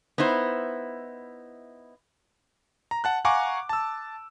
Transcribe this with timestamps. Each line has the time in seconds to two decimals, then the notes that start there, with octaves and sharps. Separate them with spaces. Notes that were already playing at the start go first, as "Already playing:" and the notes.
0.18 B3 D#4 E4 C5
2.91 A#5
3.04 F#5 A5 F#6
3.25 F5 F#5 G#5 A#5 C#6 D6
3.69 A5 E6